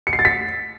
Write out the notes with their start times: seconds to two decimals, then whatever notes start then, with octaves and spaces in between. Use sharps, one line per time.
0.07 C#7
0.13 C7
0.19 A6
0.25 B6